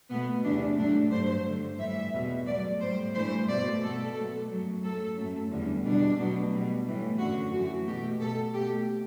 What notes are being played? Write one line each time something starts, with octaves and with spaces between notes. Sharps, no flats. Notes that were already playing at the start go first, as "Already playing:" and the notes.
B2 A3 B3
E2 C3 E3 A3 D4
A2 F#3 A3 D4
G2 D3 F#3 A3 C5
G2 D3 A3
A2 E3 G3 E5
E2 B2 G3
B2 F#3 A3 D5
A2 G3 C5
G2 E3 A3 C5
B2 A3 D5
B2 A3 A4
B2 F#3 A3
F#2 F#3 A3
A2 F#3 A3 A4
F#2 F#3 A3
E2 D3 G3
E2 B2 G3 D4
B2 F#3 A3
B2 G3
A2 E3 A3
F#2 D3 F#3 A3 F#4
F#2 E3 A3 F#4
B2 A3 G4
B2 A3 A4
B2 A3 G4